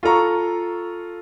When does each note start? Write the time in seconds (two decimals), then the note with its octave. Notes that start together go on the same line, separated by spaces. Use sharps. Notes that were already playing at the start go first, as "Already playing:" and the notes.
0.03 F4 A4 A#5 C#6